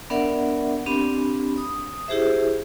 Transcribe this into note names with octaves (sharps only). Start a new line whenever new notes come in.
B3 D4 A#4 D5 E5 F#5
C4 D4 G4 B5
D#6
E4 G4 G#4 C5 E5